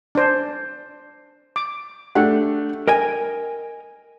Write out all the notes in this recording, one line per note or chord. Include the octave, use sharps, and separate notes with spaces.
D4 C5
D6
A3 D4 G4 F#5
A#4 D#5 G5 G#5